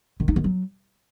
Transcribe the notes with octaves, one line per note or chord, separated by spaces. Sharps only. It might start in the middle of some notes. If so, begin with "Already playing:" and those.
D#3
D#4
D#3
F#3